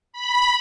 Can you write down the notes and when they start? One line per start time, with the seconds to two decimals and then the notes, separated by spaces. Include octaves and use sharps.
0.13 B5